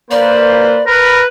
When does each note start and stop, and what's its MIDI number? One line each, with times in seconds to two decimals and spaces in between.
0.11 0.80 58
0.11 0.80 71
0.11 0.80 72
0.11 0.84 74
0.86 1.20 70
0.86 1.28 71